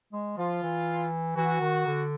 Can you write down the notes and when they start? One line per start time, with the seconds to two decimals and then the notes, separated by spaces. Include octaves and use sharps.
0.13 G#3
0.38 F3 F4
0.63 E3
1.37 E3 F#4
1.61 D#3
1.87 D3